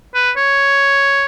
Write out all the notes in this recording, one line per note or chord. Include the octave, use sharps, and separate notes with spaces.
B4
C#5